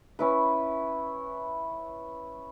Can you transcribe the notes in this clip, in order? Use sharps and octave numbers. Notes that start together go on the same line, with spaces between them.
C#4 E4 B4